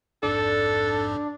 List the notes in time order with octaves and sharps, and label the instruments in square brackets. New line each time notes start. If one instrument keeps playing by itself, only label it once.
[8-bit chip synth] A#1 F2 G#2 [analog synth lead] D4 [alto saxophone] A4